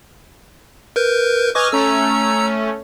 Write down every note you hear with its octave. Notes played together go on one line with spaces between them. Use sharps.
A#4 B4 G6
B4 D#5 G#5 C#6 D6 F6
A3 C#4 A#5 E6